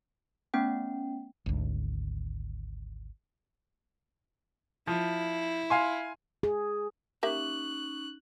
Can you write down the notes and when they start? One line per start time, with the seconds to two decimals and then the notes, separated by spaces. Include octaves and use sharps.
0.54 A3 B3 C#4 G5
1.46 G#1 D2
4.87 F3 E4
5.70 F5 G#5 C6
6.43 G#4
7.23 A#3 C#4 D#4 G4 E5 C#6 F#6